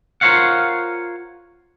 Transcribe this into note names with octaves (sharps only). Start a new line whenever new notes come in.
F4 A#4 C5 C#5 F5 F#5